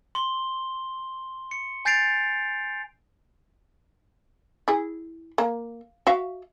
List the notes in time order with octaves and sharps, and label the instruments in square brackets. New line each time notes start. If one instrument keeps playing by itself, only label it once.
[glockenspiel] C6 G7
C#7
G#5 G6 A6 C7 D7 F7
[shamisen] E4 G#4
A#3
F#4 E5 F5